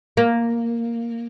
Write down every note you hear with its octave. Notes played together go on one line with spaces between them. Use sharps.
A#3